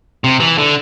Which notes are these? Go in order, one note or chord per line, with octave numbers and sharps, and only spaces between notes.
C3
E3
D3